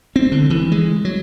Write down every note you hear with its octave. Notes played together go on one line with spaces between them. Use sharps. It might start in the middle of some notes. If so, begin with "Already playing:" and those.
C4
D3
E3
G#3
F#3